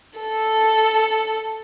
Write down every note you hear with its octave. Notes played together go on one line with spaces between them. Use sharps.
A4